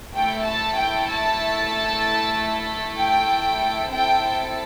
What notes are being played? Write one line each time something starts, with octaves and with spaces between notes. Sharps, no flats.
A3 E4 A4 G5
A5
G5
A5
G5
C4 E4 A4 G5